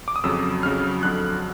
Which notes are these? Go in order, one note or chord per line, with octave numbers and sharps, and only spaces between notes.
D6
D#6
F2 C#3 F#3 E6
F2 C#3 F#3 F6
F2 D3 F#3 F#6